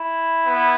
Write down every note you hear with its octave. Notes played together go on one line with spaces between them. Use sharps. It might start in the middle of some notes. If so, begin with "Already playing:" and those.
Already playing: E4
B3